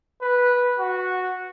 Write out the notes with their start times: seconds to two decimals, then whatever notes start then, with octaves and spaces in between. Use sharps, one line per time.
0.22 B4
0.79 F#4